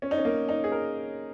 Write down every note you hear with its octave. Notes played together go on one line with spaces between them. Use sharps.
C#4
D#4
C#4
A#3
D#4
G#4
A#4